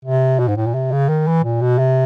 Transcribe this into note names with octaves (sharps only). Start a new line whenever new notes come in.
C3
B2
G#2
A2
A#2
C3
C#3
D#3
E3
A#2
B2
C3